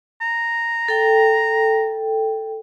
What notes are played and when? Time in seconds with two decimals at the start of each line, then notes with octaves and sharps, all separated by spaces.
0.21 A#5
0.88 A4 G5